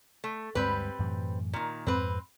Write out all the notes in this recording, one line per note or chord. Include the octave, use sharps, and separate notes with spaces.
A3
D2 G2 G3 G#3 C4 B4
F#2 A2 E3
A#2 D#3
F2 G#2 C4 B4